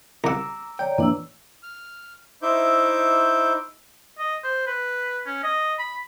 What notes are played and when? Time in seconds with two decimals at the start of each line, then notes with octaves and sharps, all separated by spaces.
0.24 C2 F#5 A#5 D6 E6
0.79 C#5 D5 G5 A#5
0.98 F2 A2 E3 A#3 D4 E6
1.63 F6
2.42 D#4 E4 C5 E5 D6 G6
4.19 D#5
4.44 C5
4.67 B4
5.26 C#4
5.44 D#5
5.79 B5